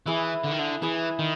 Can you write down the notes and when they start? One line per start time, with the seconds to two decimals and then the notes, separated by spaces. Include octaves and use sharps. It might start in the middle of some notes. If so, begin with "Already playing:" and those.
0.06 E3 E4 G#4 B4
0.44 D3
0.52 D#3
0.59 D3
0.82 E3 E4 G#4 B4
1.19 D#3